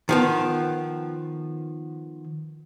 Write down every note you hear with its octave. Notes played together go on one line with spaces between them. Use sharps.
D#3 F3 B3